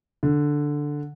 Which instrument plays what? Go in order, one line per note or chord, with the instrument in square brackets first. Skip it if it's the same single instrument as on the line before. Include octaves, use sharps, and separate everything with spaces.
[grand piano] D3